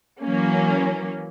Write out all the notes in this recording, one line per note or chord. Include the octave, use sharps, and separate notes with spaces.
E3 F#3 A#3 C#4